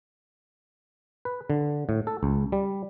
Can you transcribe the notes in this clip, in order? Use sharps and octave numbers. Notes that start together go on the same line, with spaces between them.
B4
D3
A2
A4
C#2
G3